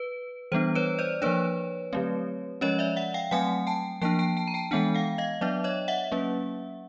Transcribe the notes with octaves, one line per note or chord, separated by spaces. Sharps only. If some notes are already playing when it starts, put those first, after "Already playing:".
Already playing: B4
E3 G3 B3 D4 C5
B4 C#5
C5 D5
F3 A#3 D4 B4 C#5
D3 F#3 A3 C4
F3 G#3 C#4 C#5 D#5
D5 E5
E5 F#5
F5 G5
F#3 A3 C4 F#5 G#5
G5 A5
F3 A#3 D4 G5 A5
G5 A5
G5 A5
A#5
G5 A5
E3 G#3 B3 D4 F#5 G#5
F5 G5
D#5 F5
F#3 B3 D4 D5 E5
C#5 D#5
E5 F#5
F#3 A#3 C#4